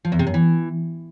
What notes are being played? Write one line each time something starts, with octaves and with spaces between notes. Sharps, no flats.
F3
E2
C3
F#2
E3